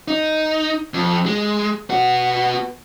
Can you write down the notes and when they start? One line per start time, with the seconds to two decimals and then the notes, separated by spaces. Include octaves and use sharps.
0.08 D#4
0.94 F2
1.26 G#3
1.90 B3 F#4